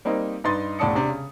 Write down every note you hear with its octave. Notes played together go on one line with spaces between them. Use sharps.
G3 A#3 C4 D#4
G2 D#4 B4 D#5 C6 A6
E1 A2 D5 A5 D#6 C#7
C3 D4
C#3